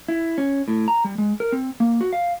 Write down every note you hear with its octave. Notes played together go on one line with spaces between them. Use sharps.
E4
C#4
A2
A#5
G3
G#3
A#4
C4
A#3
F#4
F5